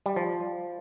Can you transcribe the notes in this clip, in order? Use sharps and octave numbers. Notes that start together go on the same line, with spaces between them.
G3
F3